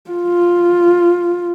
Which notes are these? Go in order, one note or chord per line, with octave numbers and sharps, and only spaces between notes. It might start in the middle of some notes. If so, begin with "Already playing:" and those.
F4